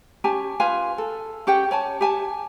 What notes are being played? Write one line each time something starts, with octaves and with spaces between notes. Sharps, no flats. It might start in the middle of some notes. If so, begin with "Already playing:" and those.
C#4 G4 G#5 A5
F4 B4 G#5
A4
C#4 G4 F#5 G5
C#5 G#5 A5
G4 G#5 A5